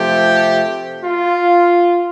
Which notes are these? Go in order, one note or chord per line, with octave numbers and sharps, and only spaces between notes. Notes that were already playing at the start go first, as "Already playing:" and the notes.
Already playing: C3 F3 A3 G4
F4